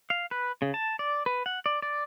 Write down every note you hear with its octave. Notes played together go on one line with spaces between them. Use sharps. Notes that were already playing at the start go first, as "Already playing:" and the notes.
F5
B4
C#3
A5
D5
B4
F#5
D5
D5